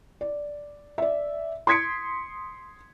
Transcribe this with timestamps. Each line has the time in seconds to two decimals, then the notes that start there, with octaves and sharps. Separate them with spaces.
0.21 D5
0.98 D5 E5
1.67 C6 D#6 G#6 B6 C#7 D7